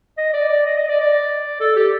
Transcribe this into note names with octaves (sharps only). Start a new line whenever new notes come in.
D#5
D5
D5
D#5
D#5
D5
D5
A4
G4